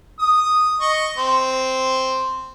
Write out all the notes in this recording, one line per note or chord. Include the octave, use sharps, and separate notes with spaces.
D#6
D#5 C#6
C4